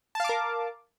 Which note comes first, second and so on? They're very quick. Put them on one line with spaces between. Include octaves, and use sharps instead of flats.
A5 F5 D6 A#4